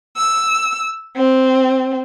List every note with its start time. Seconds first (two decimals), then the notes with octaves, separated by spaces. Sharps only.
0.16 E6
1.15 C4